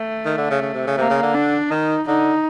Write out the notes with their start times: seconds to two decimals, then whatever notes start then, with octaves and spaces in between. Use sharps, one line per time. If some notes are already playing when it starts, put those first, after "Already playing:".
Already playing: A3
0.25 D#3
0.38 D3
0.50 C#3
0.62 C#3
0.74 C3
0.87 C#3
0.98 C3 A#3
1.10 C#3
1.23 D3
1.34 D4
1.70 D#3 D#4
2.07 D3 D#4